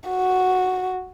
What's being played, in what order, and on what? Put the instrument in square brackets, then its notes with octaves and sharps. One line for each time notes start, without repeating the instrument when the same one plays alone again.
[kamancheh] F#4